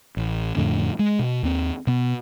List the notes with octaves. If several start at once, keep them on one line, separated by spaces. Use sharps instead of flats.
A1
F2 A2 D3
G#3
B2
D#2 C4
B2 B3